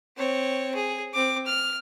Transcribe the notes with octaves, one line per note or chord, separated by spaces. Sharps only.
C4 C#5
G#4
C4 D6
F6